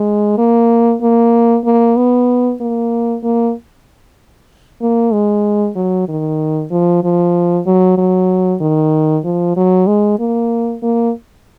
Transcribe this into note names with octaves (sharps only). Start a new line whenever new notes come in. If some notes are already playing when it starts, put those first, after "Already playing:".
Already playing: G#3
A#3
A#3
A#3
B3
A#3
A#3
A#3
G#3
F#3
D#3
F3
F3
F#3
F#3
D#3
F3
F#3
G#3
A#3
A#3